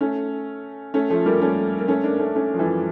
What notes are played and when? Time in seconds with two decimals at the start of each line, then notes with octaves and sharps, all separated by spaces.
0.01 A3 C#4
0.94 A3 C#4
1.10 F3 A3
1.26 G3 A#3
1.42 A3 C#4
1.79 A#3
1.88 A3 C#4
2.04 A#3 D4
2.19 A3 C#4
2.35 A3 C#4
2.54 F3
2.59 E3 G3